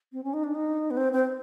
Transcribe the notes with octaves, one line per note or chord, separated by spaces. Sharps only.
C4
C#4
D#4
D4
D#4
B3
C4
C4